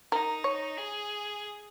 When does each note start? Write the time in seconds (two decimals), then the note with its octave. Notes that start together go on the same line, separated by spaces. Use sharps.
0.12 D#4 A#4
0.44 C#5
0.78 G#4